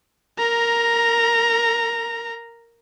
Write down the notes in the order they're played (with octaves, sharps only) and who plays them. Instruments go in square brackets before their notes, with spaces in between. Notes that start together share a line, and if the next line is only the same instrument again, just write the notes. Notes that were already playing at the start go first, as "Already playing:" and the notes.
[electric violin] A#4 A#5